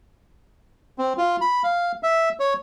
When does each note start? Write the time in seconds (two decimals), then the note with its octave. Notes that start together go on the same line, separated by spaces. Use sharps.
0.98 C4
1.18 F4
1.41 B5
1.63 F5
2.03 E5
2.40 C#5